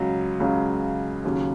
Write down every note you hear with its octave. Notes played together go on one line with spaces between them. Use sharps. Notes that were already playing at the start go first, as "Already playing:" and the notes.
Already playing: C#2 C#3 F#3
C#2 C#3 F#3
D#2 C#3 F#3